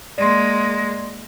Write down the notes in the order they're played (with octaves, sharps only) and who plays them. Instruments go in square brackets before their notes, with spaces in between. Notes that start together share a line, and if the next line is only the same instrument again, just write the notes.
[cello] G#3 A#3 [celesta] D5 C6